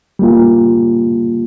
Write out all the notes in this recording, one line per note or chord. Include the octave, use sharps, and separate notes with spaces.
G3 A#3 F4